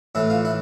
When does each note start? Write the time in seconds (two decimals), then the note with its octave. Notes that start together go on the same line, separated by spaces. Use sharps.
0.15 A2 E3 E4
0.30 F4
0.45 E4